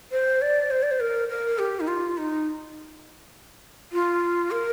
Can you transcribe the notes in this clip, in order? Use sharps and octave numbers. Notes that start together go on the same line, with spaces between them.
C5
D5
C5
D5
C5
A#4
A#4
G4
D#4
F4
D#4
F4
A#4